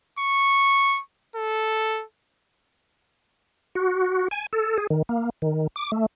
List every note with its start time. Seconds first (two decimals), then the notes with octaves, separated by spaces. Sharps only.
0.19 C#6
1.36 A4
3.75 F#4
4.31 G#5
4.53 A4
4.78 G#4
4.90 D#3
5.09 A#3
5.42 D#3
5.76 D6
5.92 A3